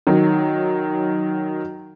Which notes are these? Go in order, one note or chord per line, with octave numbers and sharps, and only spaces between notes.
D#3 F#3